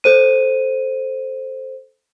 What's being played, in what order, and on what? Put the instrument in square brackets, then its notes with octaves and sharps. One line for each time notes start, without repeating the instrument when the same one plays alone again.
[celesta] A4 C5 D#7